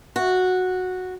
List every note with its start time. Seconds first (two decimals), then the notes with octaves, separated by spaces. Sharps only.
0.16 F#4